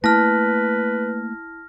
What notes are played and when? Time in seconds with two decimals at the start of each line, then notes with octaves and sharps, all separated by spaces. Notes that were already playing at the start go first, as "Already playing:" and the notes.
0.04 A3 A#3 E4 B4 A5 F6 A#6